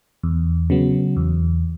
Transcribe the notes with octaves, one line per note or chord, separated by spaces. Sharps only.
E2
C#3 F#3 B3
E2